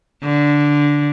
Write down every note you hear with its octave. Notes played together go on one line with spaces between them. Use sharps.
D3